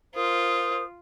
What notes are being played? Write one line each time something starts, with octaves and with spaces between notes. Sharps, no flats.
F4 A#4 C5 D#6